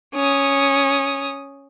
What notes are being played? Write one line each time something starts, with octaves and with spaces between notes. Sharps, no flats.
C#4 D#6